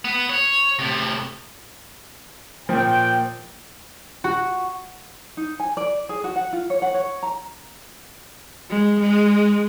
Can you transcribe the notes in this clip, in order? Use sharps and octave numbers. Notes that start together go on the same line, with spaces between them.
B3
C#5
A2 C3
A#2 F3 G5
F#4
D#4
G#5
D5
G#4
F#4
F#5
F4
C#5
F#5
C#5
A#5
G#3
G#3